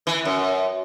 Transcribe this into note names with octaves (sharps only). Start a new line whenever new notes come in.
E3
F#2